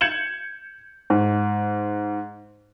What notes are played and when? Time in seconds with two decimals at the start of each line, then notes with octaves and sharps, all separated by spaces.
0.01 G6 G#6 C#7 E7 F#7
1.10 G#2